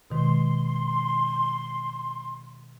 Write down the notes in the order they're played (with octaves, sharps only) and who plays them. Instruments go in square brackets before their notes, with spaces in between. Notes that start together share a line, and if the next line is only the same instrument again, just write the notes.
[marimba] B2 D#3 G#3 [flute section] C6